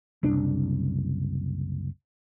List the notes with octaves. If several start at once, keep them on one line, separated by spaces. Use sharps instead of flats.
F#1 C2 D4